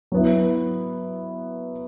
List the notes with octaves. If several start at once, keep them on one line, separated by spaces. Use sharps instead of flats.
F#3 B3 E4